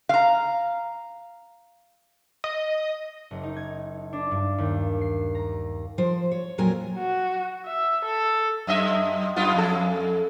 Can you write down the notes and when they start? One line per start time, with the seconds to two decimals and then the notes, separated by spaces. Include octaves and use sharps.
0.09 F5 A#5
2.44 D#5
3.31 F#1
3.43 D#4
3.57 G#6
4.13 D4
4.31 G2
4.58 D#2
5.01 C7
5.35 A#5
5.98 F3 C5
6.31 C#5
6.58 F2 A#2 F#3 A#4 G#5
6.98 F#4
7.66 E5
8.05 A4
8.67 F#2 D#5 E5
9.36 F#2 B3 F4
9.54 F2 A4